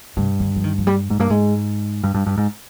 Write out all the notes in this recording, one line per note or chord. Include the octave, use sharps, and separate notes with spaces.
G2 C3
D3
F3
D#3
F3
G3
G#2 G#3
G2 A#3
G#2 G#3
G2 G#3
G2
G2
G#2